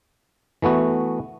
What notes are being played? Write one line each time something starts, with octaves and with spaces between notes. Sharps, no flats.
E3 A3 B3 F#4